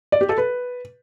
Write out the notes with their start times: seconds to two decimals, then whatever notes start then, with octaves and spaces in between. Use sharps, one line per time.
0.12 D5
0.21 G4
0.29 A4
0.38 B4